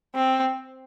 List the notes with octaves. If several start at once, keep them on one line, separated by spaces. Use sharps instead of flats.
C4